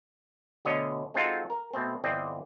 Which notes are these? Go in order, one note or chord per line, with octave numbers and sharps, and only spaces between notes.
D2 B2 D3 C#5 D#5
G#3 C4 D#4 F4 F#4 A4
A#4
B2 A3 C4
G1 E3 C4 D5 D#5 G5